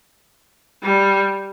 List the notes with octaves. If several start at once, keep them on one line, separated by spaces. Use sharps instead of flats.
G3